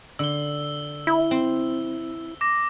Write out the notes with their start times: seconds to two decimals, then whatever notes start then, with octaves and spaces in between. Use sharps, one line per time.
0.19 D3 E6 G7
1.07 E4
1.31 C4
2.41 D6 A#6